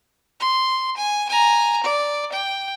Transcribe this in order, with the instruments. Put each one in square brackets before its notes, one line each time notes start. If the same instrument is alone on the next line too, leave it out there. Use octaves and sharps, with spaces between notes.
[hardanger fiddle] C6
G#5
G#5 A#5
D5
G5